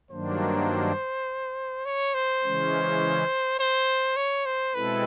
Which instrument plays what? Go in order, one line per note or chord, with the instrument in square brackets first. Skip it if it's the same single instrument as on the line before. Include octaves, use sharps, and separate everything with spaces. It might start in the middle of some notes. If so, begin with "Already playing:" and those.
[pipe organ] G2 D#3 F#3 A#3 D4 [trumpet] C5
[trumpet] C#5
C5
[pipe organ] C#3 E3 G#3 C#4
[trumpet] C5
C#5
C5
[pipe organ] B2 G#3 C4 E4 A4 [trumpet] B4